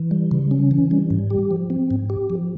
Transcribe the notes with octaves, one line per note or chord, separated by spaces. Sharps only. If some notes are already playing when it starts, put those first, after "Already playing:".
Already playing: E3
G3
C#3
C#4
E3
G3
G#2
G4
F3
C4
G#2
G4
F3